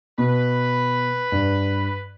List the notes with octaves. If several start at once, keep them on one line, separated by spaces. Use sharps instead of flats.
B2 B4
G2